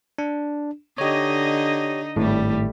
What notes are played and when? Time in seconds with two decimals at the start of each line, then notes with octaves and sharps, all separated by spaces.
0.18 D4
0.98 D3 D#4 G4 C#5 D#5
2.16 G#1 A2 G3 A3